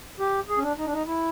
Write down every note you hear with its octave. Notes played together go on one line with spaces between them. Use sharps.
G4
G#4
C#4
D4
D#4
D4
D#4
E4